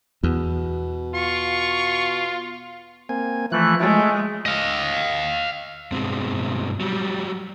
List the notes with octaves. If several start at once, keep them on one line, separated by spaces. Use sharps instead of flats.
E2 B2
F4 C#6
A#3 C4 G#5
E3 F3 A3 F#6
G#3 A3
D#5 F5
G2 B2 G#3 C4
F#3 G3